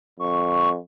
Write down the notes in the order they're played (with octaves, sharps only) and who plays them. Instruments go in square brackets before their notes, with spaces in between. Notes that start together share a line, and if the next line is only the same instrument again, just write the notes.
[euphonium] F2 [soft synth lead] C#6